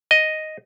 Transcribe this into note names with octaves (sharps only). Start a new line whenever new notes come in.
D#5